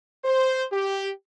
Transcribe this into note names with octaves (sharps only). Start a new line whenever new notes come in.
C5
G4